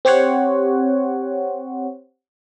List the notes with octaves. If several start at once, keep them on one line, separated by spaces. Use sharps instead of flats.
C4 G4 C5 C#5 F#5